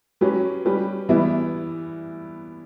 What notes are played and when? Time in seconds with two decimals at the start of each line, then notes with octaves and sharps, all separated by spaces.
0.21 F#3 C#4 G4 B4
0.65 G3 C#4 G4 B4
1.09 E3 G3 B3 E4